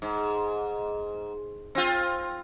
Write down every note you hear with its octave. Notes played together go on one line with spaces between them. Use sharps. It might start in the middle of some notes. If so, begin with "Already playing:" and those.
G#2
C4 F4